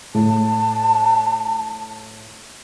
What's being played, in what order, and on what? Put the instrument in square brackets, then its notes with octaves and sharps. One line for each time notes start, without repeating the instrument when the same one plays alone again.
[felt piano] A2 [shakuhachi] A5